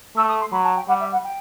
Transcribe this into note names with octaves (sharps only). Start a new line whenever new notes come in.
A3 E6
D#6
C6
F#3 B5
A5
G5
G3 F#5
E5
F#5
G5